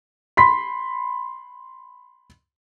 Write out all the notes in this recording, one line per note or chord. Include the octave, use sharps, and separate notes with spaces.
B5 C6 B6